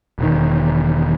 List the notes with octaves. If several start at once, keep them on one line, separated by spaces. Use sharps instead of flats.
E1 E2 D#3